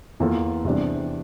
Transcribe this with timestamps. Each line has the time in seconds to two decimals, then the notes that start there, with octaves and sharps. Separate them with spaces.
0.20 E2 E3 A#3 F4 A4
0.65 E2 C3 G3 D4